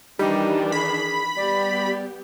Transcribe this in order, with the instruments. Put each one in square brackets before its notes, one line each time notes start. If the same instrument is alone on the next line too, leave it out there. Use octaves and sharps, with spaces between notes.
[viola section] D#3 E3 D4 [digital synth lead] G3 [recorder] D#4
[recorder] G#4 [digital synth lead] B5
[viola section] G3 B3 G4 [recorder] D5